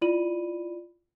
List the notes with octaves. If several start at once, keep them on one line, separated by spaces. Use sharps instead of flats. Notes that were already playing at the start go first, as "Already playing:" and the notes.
E4 F4 D5 B5 D#7 F#7